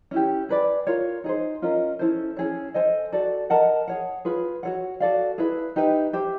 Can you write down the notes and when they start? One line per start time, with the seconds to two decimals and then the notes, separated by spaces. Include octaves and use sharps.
0.11 C#4 E4 G4
0.49 G#4 B4 D5
0.87 F4 A#4 C#5
1.24 D#4 G#4 C5
1.62 C#4 F4 A#4 D#5
1.99 C#4 E4 A4 C5
2.37 C#4 E4 G#4 C#5
2.74 A4 C5 D#5 G#5
3.12 F#4 A4 D5
3.50 A#4 D#5 F#5 A5
3.88 G#4 C#5 F#5
4.25 F4 G#4 B4
4.63 F#4 A4 C#5 F#5
5.00 F#4 A4 D5 F5
5.38 E4 G#4 B4 E5
5.76 D#4 G4 B4 E5
6.13 G4 C5 E5